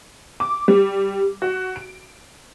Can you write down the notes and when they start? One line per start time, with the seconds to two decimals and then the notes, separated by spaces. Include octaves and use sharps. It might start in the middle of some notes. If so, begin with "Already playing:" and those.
0.40 D6
0.68 G3
1.42 F#4
1.76 D7